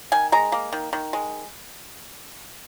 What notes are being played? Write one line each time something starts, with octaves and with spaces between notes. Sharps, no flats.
D#3 G#5
G#3 A#5
A#3
D#3
D#3
G#3